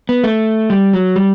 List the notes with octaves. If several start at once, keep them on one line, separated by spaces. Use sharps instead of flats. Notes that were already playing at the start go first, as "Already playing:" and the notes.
B3
A3
G3
F#3
G3